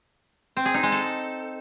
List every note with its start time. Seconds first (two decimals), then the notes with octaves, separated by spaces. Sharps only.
0.57 C4
0.65 G#4
0.74 D#4
0.83 G#3
0.92 A4